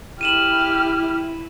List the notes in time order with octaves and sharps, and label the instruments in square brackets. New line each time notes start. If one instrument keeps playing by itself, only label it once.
[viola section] E4 [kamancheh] G4 F6 [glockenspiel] D#7 E7 F#7